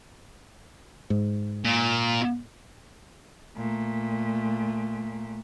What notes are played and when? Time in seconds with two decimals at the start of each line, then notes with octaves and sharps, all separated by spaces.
1.10 G#2
1.64 A#2
3.56 A#2 A3